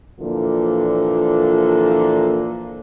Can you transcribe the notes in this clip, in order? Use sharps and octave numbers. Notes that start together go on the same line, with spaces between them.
A#2 D3 E3 F3 A#3